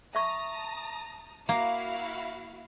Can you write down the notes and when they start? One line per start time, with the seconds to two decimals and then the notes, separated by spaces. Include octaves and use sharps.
0.15 E5 A5 A#5 C#6 D#6
1.49 A#3 E4 F#4 F5